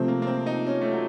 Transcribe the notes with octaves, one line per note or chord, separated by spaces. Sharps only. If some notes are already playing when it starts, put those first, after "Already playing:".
Already playing: C3 F3 A3 C4
A#3
A#3
C4
D#4
C#4
A3
F#3